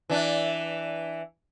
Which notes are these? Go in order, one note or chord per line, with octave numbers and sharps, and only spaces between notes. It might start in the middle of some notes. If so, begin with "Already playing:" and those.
E3 D4